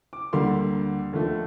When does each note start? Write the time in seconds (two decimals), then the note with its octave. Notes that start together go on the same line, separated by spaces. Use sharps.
0.13 D6
0.33 D2 D3 G3 A#3 C6
1.13 D#2 D3 F3 A3